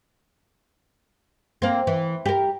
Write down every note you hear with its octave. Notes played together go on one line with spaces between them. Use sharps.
A#3 C4
E3
G4 A#4